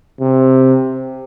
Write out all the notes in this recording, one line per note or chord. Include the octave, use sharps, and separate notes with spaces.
C3